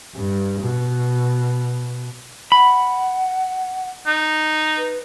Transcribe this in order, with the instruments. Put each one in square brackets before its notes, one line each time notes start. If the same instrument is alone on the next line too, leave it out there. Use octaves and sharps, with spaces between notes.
[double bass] G2
B2
[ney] F#5 [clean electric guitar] B5
[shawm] D#4
[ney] B4